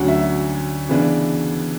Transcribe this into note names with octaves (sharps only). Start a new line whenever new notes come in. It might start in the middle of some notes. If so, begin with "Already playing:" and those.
Already playing: D2 D3 F#3 C#4 F#5
E5
C#3 E3 B3 D4